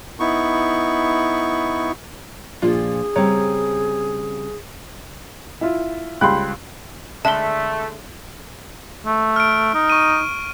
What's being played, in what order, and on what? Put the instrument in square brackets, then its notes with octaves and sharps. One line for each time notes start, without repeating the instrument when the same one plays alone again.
[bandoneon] B3 D#4 E4 C#6
[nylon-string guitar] A#2 F3 D4 [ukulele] F4 [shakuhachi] G#4
[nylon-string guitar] C#3 G3 C4 [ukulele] C#5 A#5
[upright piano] E4 F4
[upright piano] C#2 G3 F#6 [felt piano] G5 B5 C6
[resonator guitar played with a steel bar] D3 G#3 E5 [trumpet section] A3 [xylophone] A5 G7
[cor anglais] A3
[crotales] F6 D7
[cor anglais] D#4
[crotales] C#6 D#7